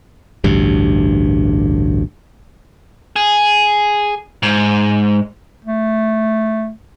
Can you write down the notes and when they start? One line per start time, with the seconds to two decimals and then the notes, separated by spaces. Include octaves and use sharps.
0.44 A1 D2 G2
3.16 G#4
4.43 G#2
5.65 A3